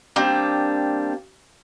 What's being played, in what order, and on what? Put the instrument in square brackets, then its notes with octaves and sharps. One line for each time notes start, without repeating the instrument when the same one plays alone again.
[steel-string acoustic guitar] G3 A#3 C4 D4